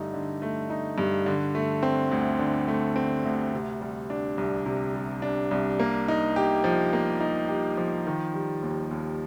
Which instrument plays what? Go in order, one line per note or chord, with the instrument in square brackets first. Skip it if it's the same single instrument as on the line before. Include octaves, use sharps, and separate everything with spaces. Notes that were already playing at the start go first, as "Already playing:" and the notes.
Already playing: [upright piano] G2 D3 A3 D#4
D3
A3
D#4
G2
D3
A3
C4
D2
D3
A3
C4
D2
C3
G3
D4
C2
C3
G3
D4
C2
A#3
D#4
G4
F3
A#3
D#4
G4
F3
D#3
G3
D#2
D#2